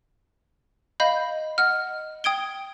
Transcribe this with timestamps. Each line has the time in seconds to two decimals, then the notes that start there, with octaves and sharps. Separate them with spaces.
1.00 D#5 F5 B5 G6
1.58 D#5 F#5 F6
2.24 G5 D#6 G#6 D7 G7